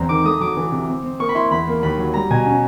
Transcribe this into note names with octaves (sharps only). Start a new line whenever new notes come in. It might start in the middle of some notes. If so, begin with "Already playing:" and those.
Already playing: E2 C4 A#5
D#3 D6
A3 D#6
F#3 D6
E3
C3
C4
C4
A#3 C#6
B5
E4 C6
E2 B5
A#3
D#2 B5
F#3
G3 A#5
B2 G#5
C#4